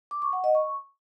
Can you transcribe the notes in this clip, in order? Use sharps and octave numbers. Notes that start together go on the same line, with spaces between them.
D6
C#6
F#5
D#5
C#6